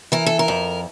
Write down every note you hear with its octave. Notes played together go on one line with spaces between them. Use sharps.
E3 A#4
A4
A#4
F2